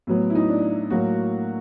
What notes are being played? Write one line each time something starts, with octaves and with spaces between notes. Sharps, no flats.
A2 F#3 B3
E4
D#4
D4
A2 F#3 A#3 F#4